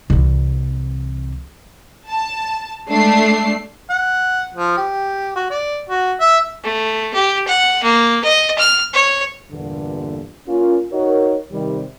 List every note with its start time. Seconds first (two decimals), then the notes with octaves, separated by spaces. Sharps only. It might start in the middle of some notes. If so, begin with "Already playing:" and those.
0.10 C2 E3
2.09 A5
2.91 G#3 A3 D4 C7
3.90 F#5
4.55 F3
4.77 G4
5.36 F#4
5.51 D5
5.90 F#4
6.21 E5
6.63 A3
7.14 G4
7.47 F#5
7.83 A#3
8.24 D#5
8.58 F6
8.93 C#5
9.51 E2 G2 A#2 D3
10.48 A#3 C#4 F4
10.92 D#4 F#4 A#4 C#5
11.53 C3 D#3 G3